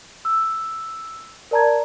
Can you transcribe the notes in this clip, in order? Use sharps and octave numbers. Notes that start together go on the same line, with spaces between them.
E6
A#4 D5 A5 A#5 G#6